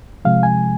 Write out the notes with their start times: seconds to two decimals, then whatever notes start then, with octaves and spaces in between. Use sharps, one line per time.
0.25 C3 F3 G#3 F5
0.43 G#5